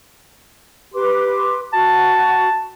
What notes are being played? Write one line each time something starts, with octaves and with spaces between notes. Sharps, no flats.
G4 B4 C6 D6
F#4 A5